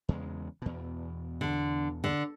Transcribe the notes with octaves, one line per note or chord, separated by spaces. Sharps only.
E2 C#3 G#3
E2 B2
D3
D3